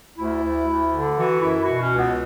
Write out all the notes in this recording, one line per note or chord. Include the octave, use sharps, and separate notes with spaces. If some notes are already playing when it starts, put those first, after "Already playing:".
D2 E4
D2
D2
D3
E3 F#4
F#2 E4
B2 F#4
C#4
C#2
B3